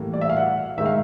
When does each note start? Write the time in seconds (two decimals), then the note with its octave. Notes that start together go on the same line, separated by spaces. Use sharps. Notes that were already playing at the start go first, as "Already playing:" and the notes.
Already playing: A2 E3 G3 A#3
0.13 D5
0.21 E5
0.30 F5
0.37 F#5
0.78 D#3 G#3 E5
0.86 F5